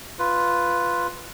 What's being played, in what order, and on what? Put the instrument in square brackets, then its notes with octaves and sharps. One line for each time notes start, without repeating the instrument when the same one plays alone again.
[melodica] F4 B4